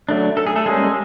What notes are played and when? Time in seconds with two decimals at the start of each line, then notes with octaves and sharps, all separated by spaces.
0.09 F#3 A3 D4
0.37 A4
0.47 G#4
0.56 A3 A4
0.66 G3 G#3 A#3 C#4 G#4